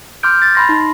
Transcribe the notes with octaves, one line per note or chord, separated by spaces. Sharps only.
C6 D6 F6 G6 D7
A6
B5 C6 A#6
D#4